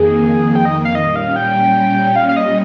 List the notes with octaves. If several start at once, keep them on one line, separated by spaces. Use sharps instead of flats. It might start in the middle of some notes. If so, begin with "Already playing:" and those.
Already playing: F2 D#3 A#3 G#4
G5
D#5
F5
A#2 G3 C#4 D#5
F5
G5
F5
F5
D#5